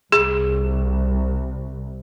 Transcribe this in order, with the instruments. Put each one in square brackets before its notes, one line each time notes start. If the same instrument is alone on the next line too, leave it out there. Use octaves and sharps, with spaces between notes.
[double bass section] C2 [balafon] G#4